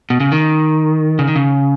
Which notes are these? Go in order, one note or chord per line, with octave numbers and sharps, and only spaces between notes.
B2
C#3
D#3
C#3
D#3
C#3